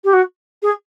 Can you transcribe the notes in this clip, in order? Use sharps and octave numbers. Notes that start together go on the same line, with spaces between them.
G4
F#4
G#4